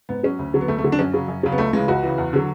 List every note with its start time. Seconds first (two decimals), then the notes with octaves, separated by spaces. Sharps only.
0.09 G#2 B3
0.23 F#3 C#4
0.39 D2
0.54 D3 F#3
0.61 B3
0.68 D2 A3
0.78 A3
0.84 D3 F#3
0.92 D4
0.99 F#2 C#4
1.13 C#3 F#3
1.28 F#2
1.43 C#3 F#3
1.52 B3
1.58 C#2 A3
1.73 C#3 E3 G#3
1.88 C#2 F#4
2.03 C#3 E3
2.18 E2
2.33 D3 F#3